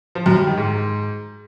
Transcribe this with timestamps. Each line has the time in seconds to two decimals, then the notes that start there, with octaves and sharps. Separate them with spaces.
0.15 F3
0.26 F#2
0.36 G3
0.47 D#3
0.57 G#2